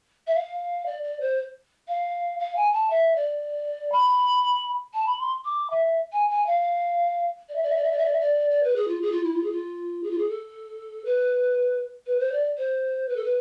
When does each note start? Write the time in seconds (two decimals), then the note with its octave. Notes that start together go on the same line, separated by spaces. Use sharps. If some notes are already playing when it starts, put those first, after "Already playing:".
0.27 E5
0.35 F5
0.86 D5
1.03 D5
1.20 C5
1.88 F5
2.39 F5
2.56 G#5
2.72 A5
2.90 E5
3.16 D5
3.92 B5
4.94 A5
5.06 B5
5.19 C6
5.45 D6
5.70 E5
6.12 G#5
6.30 G#5
6.46 F5
7.49 D5
7.55 E5
7.63 D5
7.69 E5
7.76 D5
7.83 E5
7.91 D5
7.98 E5
8.05 D5
8.12 E5
8.20 D5
8.50 D5
8.63 B4
8.76 G#4
8.88 F4
9.01 G#4
9.12 F4
9.23 E4
9.34 F4
9.43 G#4
9.52 F4
10.03 G#4
10.11 F4
10.18 G#4
10.29 A4
11.05 B4
12.06 B4
12.20 C5
12.32 D5
12.57 C5
13.08 B4
13.16 A4
13.24 B4